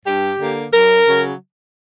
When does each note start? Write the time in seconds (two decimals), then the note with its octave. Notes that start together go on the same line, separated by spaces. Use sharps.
0.05 G2 G4
0.39 D3 A#3
0.73 F#2 A#4
1.08 C#3 F#3